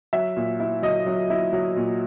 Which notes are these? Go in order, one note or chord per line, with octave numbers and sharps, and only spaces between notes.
F#3 E5
A#2
E4
F#3 D#5
F#3
E4
F#3
A#2